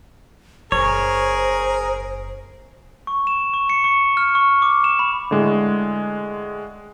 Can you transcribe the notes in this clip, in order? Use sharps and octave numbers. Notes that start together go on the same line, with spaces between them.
F#1 G#4 A#4 C5 C#5
C#6
E7
C#6
C#7
C#6
F6
C#6
D6
E7
B5
A2 D3 G#3